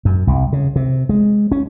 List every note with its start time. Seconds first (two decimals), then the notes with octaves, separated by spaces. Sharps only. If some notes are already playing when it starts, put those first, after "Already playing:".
0.05 F#2
0.27 C2
0.53 C#3
0.76 C3
1.09 G#3
1.52 C#4